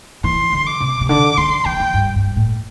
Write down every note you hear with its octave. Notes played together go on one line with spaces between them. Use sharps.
E3 C6
D3
D6
C3
C3
D3 D6
D3 C6
E3 G5
E3
G2
G2
A2